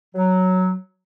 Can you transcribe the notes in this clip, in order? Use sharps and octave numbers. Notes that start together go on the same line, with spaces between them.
F#3